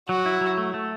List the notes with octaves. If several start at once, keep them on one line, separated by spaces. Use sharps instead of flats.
F#3 F#4
E4
F#3
A3
A3